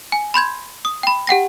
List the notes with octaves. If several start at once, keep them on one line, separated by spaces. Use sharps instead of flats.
G#5
B5 C6 G6 G#6
D#6
G5 B5
G4 F#5 G5 A#6